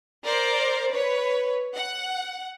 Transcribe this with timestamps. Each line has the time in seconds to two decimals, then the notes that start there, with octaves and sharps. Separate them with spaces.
0.25 A#4 C5 D5
0.92 B4 C#5
1.75 F#5